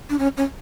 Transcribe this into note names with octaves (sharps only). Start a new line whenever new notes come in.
D4
C#4
C#4